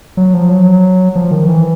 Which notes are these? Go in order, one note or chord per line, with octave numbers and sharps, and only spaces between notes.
F#3
F3
F#3
F3
D#3
E3